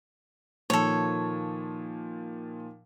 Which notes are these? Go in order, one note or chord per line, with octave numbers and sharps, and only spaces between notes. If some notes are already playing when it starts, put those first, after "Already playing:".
A#2 D#3 F3 A4 C#5